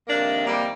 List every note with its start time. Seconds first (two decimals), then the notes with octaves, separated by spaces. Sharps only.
0.08 F2 C3 D#3 A#3 D4
0.47 G3 A#3